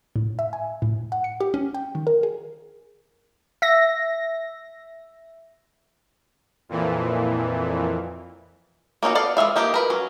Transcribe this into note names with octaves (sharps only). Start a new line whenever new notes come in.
A2
E5
G#5
A2
F#5
C#7
G4
C#4
G5
D#3
A#4
G#4
E5 A#6
F2 A#2 E3
A#3 C#4 D#4 F#4
B3 A4 D5 F5
E3 G#3 E5 F5
F3 A#3 D#4 G4
A#4 B4
F#3 C#4